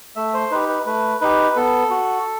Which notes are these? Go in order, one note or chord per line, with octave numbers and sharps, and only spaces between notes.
A3 E5
C5
D#4 G4 B4
B4
A3 B4
D#4 G4 B4
B3 A4
F#4